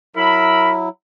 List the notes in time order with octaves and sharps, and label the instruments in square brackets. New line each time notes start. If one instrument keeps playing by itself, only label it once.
[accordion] F#3 E4 [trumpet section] A#4 E5 B5